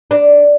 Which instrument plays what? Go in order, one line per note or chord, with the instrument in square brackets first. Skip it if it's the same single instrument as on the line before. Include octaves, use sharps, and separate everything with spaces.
[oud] D4